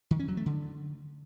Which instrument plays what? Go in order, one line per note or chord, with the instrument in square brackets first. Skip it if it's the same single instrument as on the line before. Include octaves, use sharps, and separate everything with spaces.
[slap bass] D#3
C#4
F#3
A3
D3